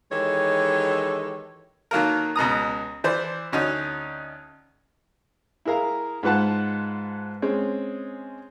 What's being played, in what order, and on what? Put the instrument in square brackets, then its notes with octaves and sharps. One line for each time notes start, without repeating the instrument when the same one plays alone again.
[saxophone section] D#3 E3 G#3 G4 A4 C#5
[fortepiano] D#3 F#3 A#3 A4 A#4
C#2 B2 A#5 D#6
E3 C5 D5
D2 C#4 D#4 F#4
E4 G#4 A#4 F5 A#5
G#2 F4 B4 F#5 A5
G#3 C4 C#4 G#4